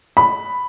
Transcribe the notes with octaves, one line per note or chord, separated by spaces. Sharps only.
B5